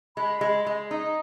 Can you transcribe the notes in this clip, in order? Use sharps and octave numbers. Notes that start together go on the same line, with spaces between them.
G#3 B5
G#3
G#3
D#4